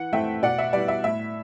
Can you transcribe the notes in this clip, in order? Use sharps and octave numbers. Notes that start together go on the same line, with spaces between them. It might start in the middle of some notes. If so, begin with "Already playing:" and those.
Already playing: E3 F#5
A3 C4 E4 E5 G5
B2 D5 F#5
E5
G3 B3 E4 D5
E5
A2 E5